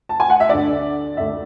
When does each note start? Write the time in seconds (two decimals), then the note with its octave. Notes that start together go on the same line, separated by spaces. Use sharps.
0.09 A5
0.20 G#5
0.30 F#5
0.40 E5
0.49 D2 D3 D5
1.17 D2 D3 E5